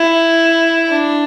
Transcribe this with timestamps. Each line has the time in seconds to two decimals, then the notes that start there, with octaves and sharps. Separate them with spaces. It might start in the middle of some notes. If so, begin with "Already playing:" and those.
Already playing: E4
0.90 D4